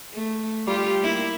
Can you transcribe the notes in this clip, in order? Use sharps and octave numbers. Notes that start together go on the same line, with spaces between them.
A3
G3 F4 G4
A#3 E4